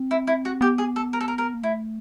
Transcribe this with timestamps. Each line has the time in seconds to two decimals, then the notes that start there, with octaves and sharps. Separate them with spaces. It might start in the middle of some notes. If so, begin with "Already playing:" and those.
Already playing: C4
0.11 E4
0.27 E4
0.45 F#4
0.61 B3 G4
0.78 G#4
0.96 A4
1.13 A#4
1.20 A4
1.28 A#4
1.38 A#4
1.54 A#3
1.63 A3 E4